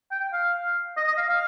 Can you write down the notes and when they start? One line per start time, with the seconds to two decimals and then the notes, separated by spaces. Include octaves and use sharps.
0.12 G5
0.33 F5
0.97 D#5
1.08 D#5
1.17 F5
1.28 F5